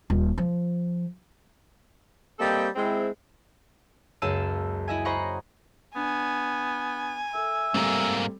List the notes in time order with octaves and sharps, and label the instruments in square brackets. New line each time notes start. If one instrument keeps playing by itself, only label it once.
[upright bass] D#1
F3
[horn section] G3 A#3 C4 A4 D#5 G5
G#3 C4 E4
[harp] C#2 F#2 A#3 A5 E6 D#7
E4 D#5 E5 G#5
C5 D#5 F#5 A#5 B5 C#6
[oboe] B3 [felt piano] D4 [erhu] G#5
[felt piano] A4 [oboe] E5
[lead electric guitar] G#2 A#3 [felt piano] G3 A3 C4